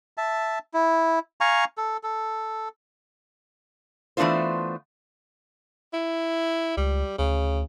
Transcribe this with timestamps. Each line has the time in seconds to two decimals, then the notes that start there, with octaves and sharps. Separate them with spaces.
0.17 E5 A5
0.74 E4
1.41 F5 G#5 A#5 C#6
1.77 A4
2.03 A4
4.17 E3 A3 B3 D4 F4 C5
5.93 E4
6.77 C#2 G3
7.18 D2 C#3